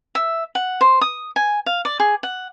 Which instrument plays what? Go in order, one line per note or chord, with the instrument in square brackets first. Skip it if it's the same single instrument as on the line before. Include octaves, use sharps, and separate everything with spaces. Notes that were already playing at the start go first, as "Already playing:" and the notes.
[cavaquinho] E5
F#5
C5
D#6
G#5
F5
D5
G#4
F#5